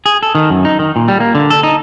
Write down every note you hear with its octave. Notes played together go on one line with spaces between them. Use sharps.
G#4
A4
D#3
F#2
D#4
D#3
A#2
G3
A#3
D3
A4
D#4